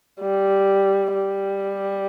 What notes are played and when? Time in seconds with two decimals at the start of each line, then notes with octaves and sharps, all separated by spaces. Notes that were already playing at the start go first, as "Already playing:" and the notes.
0.20 G3
1.13 G3